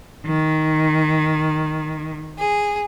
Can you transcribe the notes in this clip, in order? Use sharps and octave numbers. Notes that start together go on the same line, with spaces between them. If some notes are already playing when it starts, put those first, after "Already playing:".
D#3
G#4